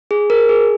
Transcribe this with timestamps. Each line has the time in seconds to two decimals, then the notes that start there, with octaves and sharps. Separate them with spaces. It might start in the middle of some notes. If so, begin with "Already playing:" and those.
0.11 G#4
0.30 A#4
0.49 G#4